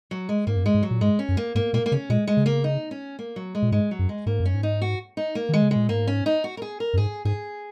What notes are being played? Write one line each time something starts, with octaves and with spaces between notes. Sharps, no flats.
F#3
G#3
G#2 A#3
F#2
G#2 G#3
G#2
F#3
A#2
G#2 G#3
C#4
F#2
A#3
G#2 A#3
A#2 A#3
A#3
C#3 C#4
A#2 G#3
G#3
C#3
A#3
D#4
C#4
A#3
F#3
G#3
A#2
G#2 G#3
F#3
F#2
G#3
G#2 A#3
F#2
C#4
G#2
D#4
F#4
D#4
A#3
D#3 G#3
C#3
A#2 G#3
G#2 A#3
C#4
D#4
F#4
A#4
G#4
A#4
F#2
G#2 G#4
G#2 G#4